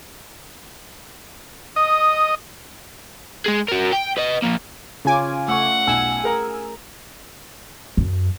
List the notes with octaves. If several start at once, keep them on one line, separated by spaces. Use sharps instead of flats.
D#5 D#6
G#3 G#4
F#4 A#4
G5
B4 D#5
F3 A#3
C#3 C#4 F4 G#5 D6
A3 F#5 C#6 E6
B1 G#5 E6
G#4 A#4 A#5
F#2